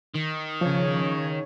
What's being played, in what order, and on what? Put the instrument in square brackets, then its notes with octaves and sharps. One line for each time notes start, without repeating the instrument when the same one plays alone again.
[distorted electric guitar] D#3
[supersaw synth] C#3 C#5 [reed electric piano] F3